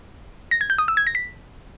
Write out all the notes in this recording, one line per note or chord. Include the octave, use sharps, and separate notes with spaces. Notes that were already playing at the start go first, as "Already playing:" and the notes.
A#6
G#6
G6
D#6
E6
G#6
A#6
B6